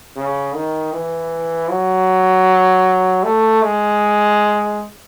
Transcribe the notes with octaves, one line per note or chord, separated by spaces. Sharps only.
C#3
D#3
E3
F#3
A3
G#3